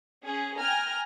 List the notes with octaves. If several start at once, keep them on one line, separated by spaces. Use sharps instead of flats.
C#4 G#4
G5 G#5 A#5 F6